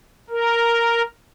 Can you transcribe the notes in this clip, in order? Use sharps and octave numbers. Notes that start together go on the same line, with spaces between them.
A#4